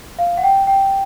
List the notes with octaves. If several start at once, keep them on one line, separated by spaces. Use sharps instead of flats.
F5
F#5
G5
G5